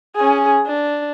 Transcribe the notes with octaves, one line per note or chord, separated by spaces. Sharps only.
C#4 G#4
D4